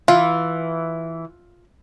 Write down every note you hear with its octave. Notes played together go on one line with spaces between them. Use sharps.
E3 F4